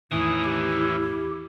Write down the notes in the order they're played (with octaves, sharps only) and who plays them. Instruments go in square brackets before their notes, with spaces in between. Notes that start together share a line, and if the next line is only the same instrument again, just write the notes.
[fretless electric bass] E2 A2 D#3 [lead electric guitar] E3 C#4 [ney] E4 [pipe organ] D#6
[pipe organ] G4